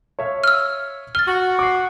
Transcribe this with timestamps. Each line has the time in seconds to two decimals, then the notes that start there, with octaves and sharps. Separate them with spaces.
0.19 C#5 E5 F5
0.44 E6 F6
1.15 F6 A6 G7
1.28 F#4
1.59 D6 C7